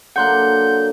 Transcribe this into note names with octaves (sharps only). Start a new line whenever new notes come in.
D3 F#3 A#3 F#5 C6 F#6 G6